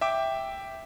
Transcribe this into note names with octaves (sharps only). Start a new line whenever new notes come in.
E5 G5 D6